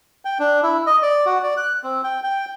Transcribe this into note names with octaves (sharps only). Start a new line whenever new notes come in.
G5
D4
E4
D#5
D5
F#4
D5
F#6
C4
G5
G5